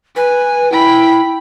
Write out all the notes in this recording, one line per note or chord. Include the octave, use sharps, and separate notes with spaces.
B4 G#5
E4 G5 B5